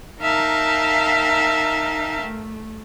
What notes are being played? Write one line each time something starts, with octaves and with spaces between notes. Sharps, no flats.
D#4 A#4 E5 F5 G5 A5
A3